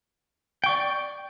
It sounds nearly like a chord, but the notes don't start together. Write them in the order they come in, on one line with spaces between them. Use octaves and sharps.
G5 C#6 D5